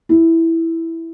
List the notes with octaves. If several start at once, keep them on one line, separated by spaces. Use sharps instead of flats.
E4